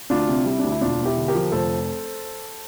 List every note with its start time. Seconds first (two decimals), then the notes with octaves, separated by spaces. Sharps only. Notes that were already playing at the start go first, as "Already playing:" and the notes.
0.10 D2 D4 F4
0.28 C3
0.45 G3 E4
0.59 D2 D4
0.71 E4
0.81 E1 D4 F4
0.99 E2
1.06 E4 G4
1.17 D3
1.28 G4 A#4
1.35 F3
1.52 F1 A4 C5